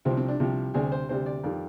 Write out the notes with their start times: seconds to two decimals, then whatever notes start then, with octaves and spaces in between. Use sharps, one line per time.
0.05 C2 C3 F3 C4
0.17 C4
0.28 D4
0.40 C2 C3 F3
0.74 D2 C3 G3 G#4
0.92 C5
1.09 D2 C3 G3 C5
1.26 D5
1.43 F2 D#3 G3 D5